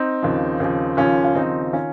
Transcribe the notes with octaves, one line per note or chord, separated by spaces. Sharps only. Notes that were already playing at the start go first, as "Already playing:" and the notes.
Already playing: C4 D#4
D#2 C#3 F3
D#2 C#3 F3
D#2 C#3 F3 C#4 F4
F4
D#2 C#3 F3 C4 D#4
D#3 C#4 F4